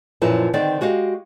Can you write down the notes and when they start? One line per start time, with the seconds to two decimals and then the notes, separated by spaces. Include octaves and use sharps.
0.22 F#2 A#2 F3 E4 B4
0.53 D3 D#3 C4 D5
0.81 G#3 F#4 G4 F5